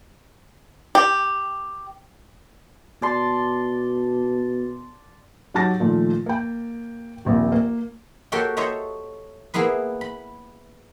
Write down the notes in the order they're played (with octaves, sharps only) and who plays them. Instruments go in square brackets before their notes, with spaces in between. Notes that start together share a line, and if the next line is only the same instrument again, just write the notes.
[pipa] G4
[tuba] B2 [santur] D5 A5 C6
[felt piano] F#3 D#4 G4 A5 A6 A#6
A#2 D#3 F3 A3
A#3 G5
D#1 A#1 C4
A#3
[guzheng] A#3 F#4 G4 A4 C#5 G5
A4 C5 C#5 D#5 E5 A#5
A#3 B3 E4 G#4 B4
B5